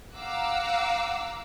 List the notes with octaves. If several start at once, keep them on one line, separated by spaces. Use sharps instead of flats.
F5 F#5 A#5 D6 E6 F#6